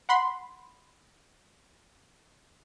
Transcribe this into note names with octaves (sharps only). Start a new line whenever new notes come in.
F#5 B5 C6